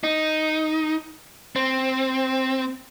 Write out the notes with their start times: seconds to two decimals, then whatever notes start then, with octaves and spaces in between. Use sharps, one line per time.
0.04 D#4
1.56 C4